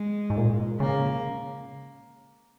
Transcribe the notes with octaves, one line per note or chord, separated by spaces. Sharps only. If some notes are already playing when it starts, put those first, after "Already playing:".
Already playing: G#3
G#2
A#2
C#3 A#3